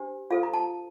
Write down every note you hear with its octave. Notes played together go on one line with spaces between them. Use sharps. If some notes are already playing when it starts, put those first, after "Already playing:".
Already playing: D4 G4 C5
F4 A4 C5 F5
A#5
A5